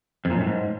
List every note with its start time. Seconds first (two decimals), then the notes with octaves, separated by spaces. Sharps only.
0.25 F2
0.30 A#2
0.36 F#2
0.41 A2
0.47 G#2